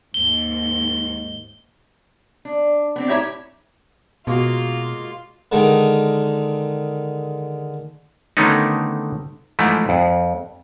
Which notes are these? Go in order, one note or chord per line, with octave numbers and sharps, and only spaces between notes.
D#2 G#2 G7
D4
B3 C4 D4
A2 D#4 E4 G4 C#5 E5
B2 G#3 A#3 F4 F#4
D3 D#3 G#3 D#4
D3 D#3 A3 B3 C#4 D#4
G#2 E3 F3 A3
F2